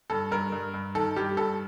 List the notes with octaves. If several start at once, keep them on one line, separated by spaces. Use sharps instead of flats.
G2 A4
G2 A#4
G2
G2
D#3 A4
G2 G4
G2 A4